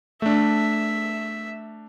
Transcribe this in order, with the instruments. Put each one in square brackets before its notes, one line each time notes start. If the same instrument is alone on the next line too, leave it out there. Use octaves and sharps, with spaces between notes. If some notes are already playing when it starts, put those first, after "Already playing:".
[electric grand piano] A3 D4 [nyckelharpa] E5